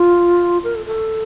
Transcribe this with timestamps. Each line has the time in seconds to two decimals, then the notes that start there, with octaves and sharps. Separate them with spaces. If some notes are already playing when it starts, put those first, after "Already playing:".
Already playing: F4
0.64 A#4
0.75 A4
0.86 A4